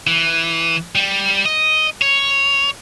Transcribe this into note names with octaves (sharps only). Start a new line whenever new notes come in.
E3
G3
D#5
C#5